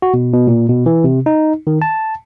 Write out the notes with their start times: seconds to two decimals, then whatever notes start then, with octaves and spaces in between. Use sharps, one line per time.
0.02 F#4
0.14 B2
0.33 B2
0.47 A#2
0.69 B2
0.86 E3
1.04 C3
1.26 D#4
1.67 D#3
1.82 A5